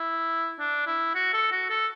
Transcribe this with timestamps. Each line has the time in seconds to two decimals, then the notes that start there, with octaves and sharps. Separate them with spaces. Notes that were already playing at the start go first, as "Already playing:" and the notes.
Already playing: E4
0.59 D4
0.87 E4
1.15 F#4
1.33 A4
1.52 F#4
1.70 A4